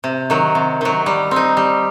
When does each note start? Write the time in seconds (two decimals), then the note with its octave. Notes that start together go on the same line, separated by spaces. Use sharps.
0.04 C3
0.30 D#3 F#3
0.55 C3
0.81 D#3 F#3
1.06 G3
1.31 C4 D#4
1.57 G3